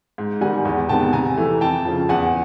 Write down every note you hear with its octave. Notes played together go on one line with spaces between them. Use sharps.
G#2
D#3 G3 F#5 G#5
E2
C3 D#3 G#3 B3 G5 A5
C3 G#5 A#5
E3 A3
F2 G5 A5
C#3 F3
E2 F#5 G#5